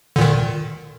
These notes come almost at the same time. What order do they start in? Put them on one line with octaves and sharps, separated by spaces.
D3 A#2 D#3